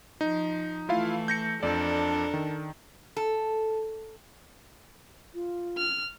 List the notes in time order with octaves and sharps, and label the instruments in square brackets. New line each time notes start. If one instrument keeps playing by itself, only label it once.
[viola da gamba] F3 [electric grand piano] D#4
[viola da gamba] E3 A3 [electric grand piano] E4 F4 F5
[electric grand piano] G6 A#6 C#7
[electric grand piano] F2 D5 [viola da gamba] D4 A4 A#4
[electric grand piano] D#3
[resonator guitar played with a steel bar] A4
[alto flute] F4
[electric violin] F6